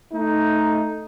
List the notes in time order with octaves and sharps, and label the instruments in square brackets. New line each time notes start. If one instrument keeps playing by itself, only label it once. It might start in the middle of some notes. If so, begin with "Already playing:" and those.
[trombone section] A3 D#4